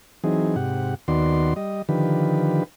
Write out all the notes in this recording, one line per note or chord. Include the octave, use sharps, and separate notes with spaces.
E3 F#3 C4 D#4 G#4
G#2 C3 G4 F#5
D#2 D#3 B3 F#4 D5 C6
G3 D#5
D3 D#3 F3 G4 B4